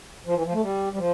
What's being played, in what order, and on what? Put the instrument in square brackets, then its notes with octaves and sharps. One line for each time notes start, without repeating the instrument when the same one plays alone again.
[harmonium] F3
E3
F3
A3
G3
G3
F3